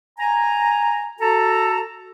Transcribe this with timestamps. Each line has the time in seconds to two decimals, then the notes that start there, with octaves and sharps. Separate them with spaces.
0.18 G#5 A#5
1.20 F#4 A4 A5 A#5